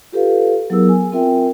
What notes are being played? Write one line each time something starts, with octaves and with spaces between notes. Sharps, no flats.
F4 G4 A4 B4 F5
F#3 B3 E4 G#4 A#4 E6
G#5
C4 F4 A#4 E5 G5